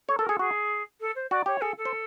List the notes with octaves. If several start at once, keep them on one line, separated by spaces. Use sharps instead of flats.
A4 C#5
A4 A#4
G#4 A4
F#4 G#4
A4
C5
F#4 D5
G4 C#5
G#4 A4
A4
C5